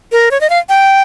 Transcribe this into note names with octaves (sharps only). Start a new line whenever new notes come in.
A#4
C#5
D#5
F5
G5